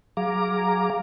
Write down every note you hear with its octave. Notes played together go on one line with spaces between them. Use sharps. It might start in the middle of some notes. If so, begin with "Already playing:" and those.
F#3 G#4 F5 A#5 D6